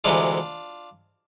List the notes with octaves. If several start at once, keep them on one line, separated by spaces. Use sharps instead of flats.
D2 C3 E3 G#3 D4 F4